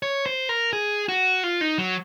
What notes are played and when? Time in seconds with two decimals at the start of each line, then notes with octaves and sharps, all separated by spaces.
0.03 C#5
0.26 C5
0.49 A#4
0.73 G#4
1.08 F#4
1.44 F4
1.61 D#4
1.78 F#3